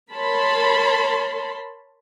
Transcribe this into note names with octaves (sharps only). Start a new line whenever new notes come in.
A#4 C#5 A5 B5 C6